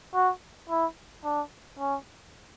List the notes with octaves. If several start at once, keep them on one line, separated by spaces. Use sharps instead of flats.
F#4
E4
D4
C#4